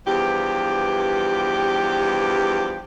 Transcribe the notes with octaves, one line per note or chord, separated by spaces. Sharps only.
E2 G2 F3 G4